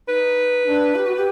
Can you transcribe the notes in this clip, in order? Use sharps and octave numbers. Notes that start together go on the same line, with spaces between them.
D#4 B4
D4
G4
F#4
G4